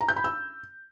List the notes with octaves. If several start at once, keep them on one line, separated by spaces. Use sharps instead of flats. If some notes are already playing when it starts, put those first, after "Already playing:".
A#5
G6
B5
E6